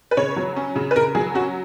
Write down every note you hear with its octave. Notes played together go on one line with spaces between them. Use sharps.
B4
C#3 C#5
F#3
C#4
C#3
B4
C#3 A#4
F#3 G#4
C#4 F#4